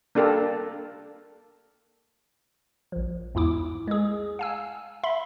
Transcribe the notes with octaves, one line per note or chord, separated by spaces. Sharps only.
A#3 D4 G4 A4 A#4
A#1 F3
E2 G#2 E4 D6
G#3 G#4
F5 G#5 E6
E5 B5 C6